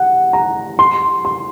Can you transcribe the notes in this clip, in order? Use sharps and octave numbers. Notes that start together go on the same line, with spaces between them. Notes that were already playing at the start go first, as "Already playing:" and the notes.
Already playing: F#5
A#5
C6
C6